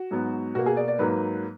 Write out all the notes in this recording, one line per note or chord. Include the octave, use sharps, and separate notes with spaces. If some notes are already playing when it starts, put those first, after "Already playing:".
Already playing: F#4
G#2 F#3 B3
B2 A#3 F#4
G#4
D5
D5
G#2 F#3 A#3 B4